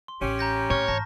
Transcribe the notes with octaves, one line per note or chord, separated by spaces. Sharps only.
C6
A1 C#4 G4
A#5 G6 A#6
A2 C#5 C#6 F6
G#1 E3 A5 A#6